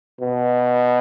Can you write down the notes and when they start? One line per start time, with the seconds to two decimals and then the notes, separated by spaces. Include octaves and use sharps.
0.21 B2